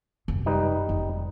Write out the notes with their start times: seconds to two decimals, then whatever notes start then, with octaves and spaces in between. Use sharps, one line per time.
0.28 F#2 C3
0.46 G3 D#4 B4
0.89 F1